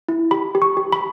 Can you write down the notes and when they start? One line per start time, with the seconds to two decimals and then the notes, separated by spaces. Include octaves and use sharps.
0.09 E4
0.31 G4 B5
0.55 G4
0.62 C#6
0.77 G4
0.92 B5